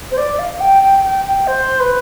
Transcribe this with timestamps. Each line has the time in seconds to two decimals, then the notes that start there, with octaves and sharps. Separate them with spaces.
0.11 C5
0.17 D5
0.39 F5
0.60 G5
0.82 G5
1.04 G5
1.25 G5
1.47 C5
1.80 B4